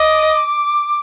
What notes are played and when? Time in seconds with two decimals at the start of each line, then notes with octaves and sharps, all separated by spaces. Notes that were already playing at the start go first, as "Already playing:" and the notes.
Already playing: D#5 D6